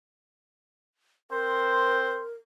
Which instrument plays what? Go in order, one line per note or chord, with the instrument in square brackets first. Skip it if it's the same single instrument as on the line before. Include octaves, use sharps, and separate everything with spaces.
[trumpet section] C4 C5 [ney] A#4